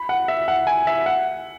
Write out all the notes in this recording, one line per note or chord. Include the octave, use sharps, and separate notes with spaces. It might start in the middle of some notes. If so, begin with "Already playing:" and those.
Already playing: B5
F#5
E5
F#5
G#5
E5
F#5